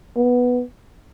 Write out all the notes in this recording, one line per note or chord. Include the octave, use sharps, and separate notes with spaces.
B3